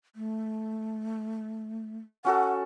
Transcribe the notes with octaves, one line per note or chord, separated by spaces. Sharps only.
A3
C#4 F#4 A4 F#5